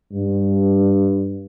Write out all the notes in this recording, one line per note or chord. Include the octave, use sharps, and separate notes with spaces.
G2